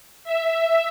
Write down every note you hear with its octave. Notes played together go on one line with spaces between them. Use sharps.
E5